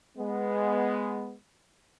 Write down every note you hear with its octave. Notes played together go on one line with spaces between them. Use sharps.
G#3 B3